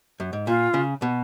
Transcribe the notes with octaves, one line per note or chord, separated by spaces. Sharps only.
F#2
G#2
A#2 F4
C#3
B2